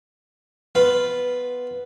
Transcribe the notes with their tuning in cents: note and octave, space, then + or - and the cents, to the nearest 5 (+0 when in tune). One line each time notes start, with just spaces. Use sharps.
B3 +0 F4 +0